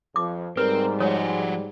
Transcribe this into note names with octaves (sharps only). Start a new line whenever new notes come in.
F2 F3 D6
G#2 G3 C4 A#4 B4
F3 G#3 F#4 C#5